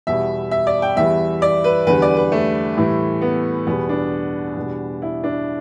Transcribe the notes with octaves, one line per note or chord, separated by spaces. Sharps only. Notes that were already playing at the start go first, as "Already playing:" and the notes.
E2 B2 G3 E5
E5
D5
G5
E2 E3 G3 E5
D5
B4
E2 D3 G3 B4
D5
B4
A3
A2 E3 G3
B3
E2 B2 G3 B3
D4
E2 B2 G3
E4
D4